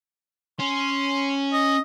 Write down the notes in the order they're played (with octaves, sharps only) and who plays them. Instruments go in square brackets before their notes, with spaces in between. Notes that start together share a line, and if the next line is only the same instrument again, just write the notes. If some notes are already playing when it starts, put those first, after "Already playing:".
[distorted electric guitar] C#4 [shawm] C6
[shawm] D#5